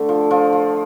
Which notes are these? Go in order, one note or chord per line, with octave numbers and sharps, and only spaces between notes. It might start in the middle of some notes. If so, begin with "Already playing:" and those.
Already playing: D3 A3
F3
F3
F3